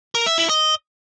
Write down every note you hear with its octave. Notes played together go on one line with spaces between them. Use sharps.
A#4
E5
E4
D#5